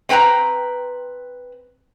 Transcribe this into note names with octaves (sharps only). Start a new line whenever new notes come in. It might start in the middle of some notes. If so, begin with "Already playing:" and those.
C4 B4 G5 A5 A#5